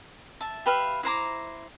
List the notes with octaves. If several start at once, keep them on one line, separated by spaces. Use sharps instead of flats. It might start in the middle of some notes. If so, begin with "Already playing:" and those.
E5 A5
G4 B4 E5 F5
E4 C5 A#5 D6